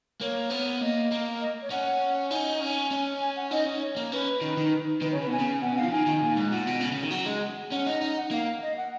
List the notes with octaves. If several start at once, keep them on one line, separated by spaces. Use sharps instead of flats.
A#3 C#5
B3
A#3 D#5
A#3
D#5
C#5
C#4 F#5
D#4 G#5
C#4 G#5
C#4
G#5
F#5
D#4 D#5
C#4
C#5
A#3
C#4 B4
D#3
D#3
D#3 B4
C#5
C#3
B4
B2 G#5
C#3
B2 F#5
F5
F3
D#3 G#5
D#3
A#2
G#2
A#2 F#5
B2
C#3
C#3
D#3
F#3 F#5
G#3
C#4 F#5
D#4
D#4 D#5
F#5
A#3 F5
D#5
F#5